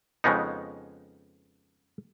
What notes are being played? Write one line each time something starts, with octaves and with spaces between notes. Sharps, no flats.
F2 C#3 G#3 B3 D#4